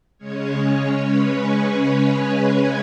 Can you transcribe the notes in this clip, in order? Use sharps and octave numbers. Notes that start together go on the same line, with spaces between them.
C#3 G#3 C#4 C#5
C#5
B4
G#4
C#5
B4